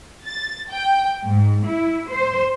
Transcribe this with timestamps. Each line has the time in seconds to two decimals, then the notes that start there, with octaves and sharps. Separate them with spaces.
0.25 A6
0.69 G5
1.27 G#2
1.66 E4
2.11 C5